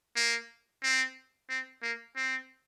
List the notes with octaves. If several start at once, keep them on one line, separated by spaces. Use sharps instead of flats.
A#3
C4
C4
A#3
C4